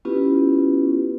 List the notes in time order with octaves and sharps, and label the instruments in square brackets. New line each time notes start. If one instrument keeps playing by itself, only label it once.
[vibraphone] B3 C#4 E4 F4 G4 B4